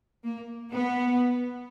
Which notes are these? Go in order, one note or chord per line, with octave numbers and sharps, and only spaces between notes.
A#3
B3